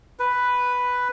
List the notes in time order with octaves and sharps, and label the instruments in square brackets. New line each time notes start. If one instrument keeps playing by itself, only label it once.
[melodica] B4